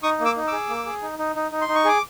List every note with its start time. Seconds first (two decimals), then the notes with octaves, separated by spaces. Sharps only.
0.03 D#4 C#6 D#6
0.20 A#3
0.25 D6 E6
0.36 D#4
0.47 G#4 D6 E6
0.69 A#3
0.86 G#4
1.02 D#4
1.19 D#4
1.36 D#4
1.51 D#4
1.61 C6
1.68 D#4
1.75 C#6
1.85 G#4 D6